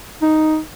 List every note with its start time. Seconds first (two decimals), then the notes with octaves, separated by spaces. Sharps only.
0.21 D#4